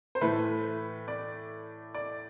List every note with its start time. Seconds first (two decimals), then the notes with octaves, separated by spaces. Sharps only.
0.15 C5
0.21 A2 E3 A3 B4
1.08 D5
1.94 D5